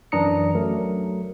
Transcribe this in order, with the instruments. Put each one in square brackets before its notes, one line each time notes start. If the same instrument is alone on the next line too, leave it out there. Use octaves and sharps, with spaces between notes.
[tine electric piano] F#2 E3 D4 A#5 D#6 C#7
F#3 A3 A#4